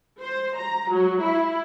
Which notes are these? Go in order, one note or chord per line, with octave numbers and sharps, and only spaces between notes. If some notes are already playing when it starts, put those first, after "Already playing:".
C5
A#5
F#3
E4